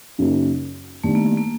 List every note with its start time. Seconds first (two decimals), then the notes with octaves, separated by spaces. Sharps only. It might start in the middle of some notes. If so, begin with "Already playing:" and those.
0.18 F#2 C#3 F#3 A#3 D#4
1.04 D#3 G3 A3 B3 D4
1.15 A#3
1.26 A3
1.38 A#3